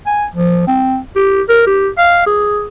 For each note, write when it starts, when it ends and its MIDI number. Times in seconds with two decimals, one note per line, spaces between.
0.07 0.25 80
0.35 0.67 53
0.67 0.97 60
1.16 1.42 67
1.49 1.65 70
1.67 1.88 67
1.98 2.21 77
2.26 2.67 68